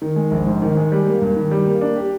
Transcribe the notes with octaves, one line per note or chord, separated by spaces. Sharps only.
D#3
G#3
A#1
G#2
D#3
G#3
G3
A#3
G2
D#3
G3
A#3
D4
G4